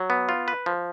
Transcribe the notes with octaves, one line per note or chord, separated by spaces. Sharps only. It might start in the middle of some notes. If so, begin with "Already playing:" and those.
Already playing: F#3
B3
F4
B4
F3